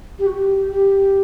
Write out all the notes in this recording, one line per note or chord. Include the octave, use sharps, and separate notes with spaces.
G4
F#4
G4
G4